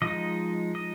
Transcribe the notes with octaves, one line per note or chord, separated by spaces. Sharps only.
F3 G#3 D#4 D#5
D#5